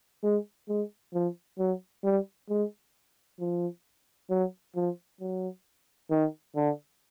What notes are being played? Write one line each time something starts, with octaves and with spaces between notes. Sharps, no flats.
G#3
G#3
F3
F#3
G3
G#3
F3
F#3
F3
F#3
D#3
D3